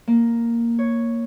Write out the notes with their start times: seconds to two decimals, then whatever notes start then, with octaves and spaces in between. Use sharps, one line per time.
0.08 A#3
0.79 C#5